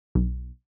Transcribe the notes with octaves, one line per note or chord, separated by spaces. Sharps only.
B1